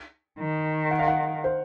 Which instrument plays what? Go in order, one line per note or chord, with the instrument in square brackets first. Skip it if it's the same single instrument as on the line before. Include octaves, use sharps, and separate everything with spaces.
[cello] D#3
[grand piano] F#5
F5
F#5
C5